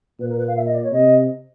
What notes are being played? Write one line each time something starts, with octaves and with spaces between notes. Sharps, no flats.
A#2 B4
A#4
B4
F5
E5
D#5
D5
C#5
C3 D#5